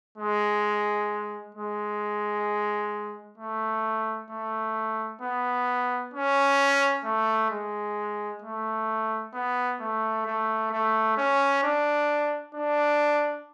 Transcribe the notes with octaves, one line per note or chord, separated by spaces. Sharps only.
G#3
G#3
A3
A3
B3
C#4
A3
G#3
A3
B3
A3
A3
A3
C#4
D4
D4